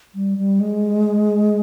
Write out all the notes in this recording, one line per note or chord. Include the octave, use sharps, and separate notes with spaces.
G3
G3
G#3